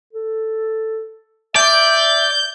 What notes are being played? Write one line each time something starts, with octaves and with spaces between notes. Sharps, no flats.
A4
D5 E5 G6